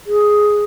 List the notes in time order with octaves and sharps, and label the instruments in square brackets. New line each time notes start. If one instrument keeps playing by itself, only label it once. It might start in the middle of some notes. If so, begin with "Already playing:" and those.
[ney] G#4